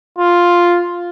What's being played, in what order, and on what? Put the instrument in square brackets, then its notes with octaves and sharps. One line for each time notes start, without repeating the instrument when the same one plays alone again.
[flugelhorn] F4